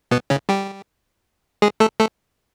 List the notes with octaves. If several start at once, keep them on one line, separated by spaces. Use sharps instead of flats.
B2 B3
C#3 C#4
G3 G4
G#3 G#4
A3 A4
A3 A4